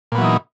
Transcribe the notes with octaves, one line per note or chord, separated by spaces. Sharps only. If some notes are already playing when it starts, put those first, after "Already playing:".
A#2 E3 F#3 B3 D#4